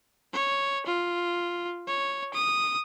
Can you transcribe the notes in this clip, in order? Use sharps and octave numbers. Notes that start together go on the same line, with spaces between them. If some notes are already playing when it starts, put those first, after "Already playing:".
C#5
F4
C#5
D#6